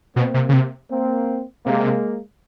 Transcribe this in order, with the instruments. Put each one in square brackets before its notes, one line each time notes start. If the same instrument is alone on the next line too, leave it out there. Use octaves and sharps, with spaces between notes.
[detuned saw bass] B2 [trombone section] A#3 C4
[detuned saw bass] C3
C#3
C3
[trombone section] A#3 C4
[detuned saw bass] C3 [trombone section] G#3 A#3